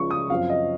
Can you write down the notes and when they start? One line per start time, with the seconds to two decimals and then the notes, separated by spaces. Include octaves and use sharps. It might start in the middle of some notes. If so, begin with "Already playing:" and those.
Already playing: C#2 C#3 F3 C#6
0.11 D#6
0.30 F#2 F3 C4 F5
0.50 D#5